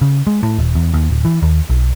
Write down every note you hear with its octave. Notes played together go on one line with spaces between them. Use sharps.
C#3
G#3
A2
D#1
E2
D#2
D1
E3
D#2
B1